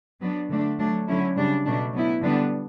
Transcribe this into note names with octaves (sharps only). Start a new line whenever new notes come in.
F#3 B3 D4
D3 A3 D4
F#3 A3 D4
D3 F#3 C#4 E4
C#3 G3 D4
B2 F#3 A3 D4
F#3 B3 E4
D3 G3 B3 D4